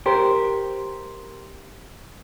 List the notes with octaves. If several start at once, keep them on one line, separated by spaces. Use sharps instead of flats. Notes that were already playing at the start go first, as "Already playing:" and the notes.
G4 A#4 C5